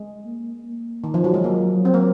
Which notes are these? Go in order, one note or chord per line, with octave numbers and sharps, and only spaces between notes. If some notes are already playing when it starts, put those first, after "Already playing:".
Already playing: G#3
A#3
A#3
D#3
F3
F#3
G#3
F#3 A#3
C4
A#3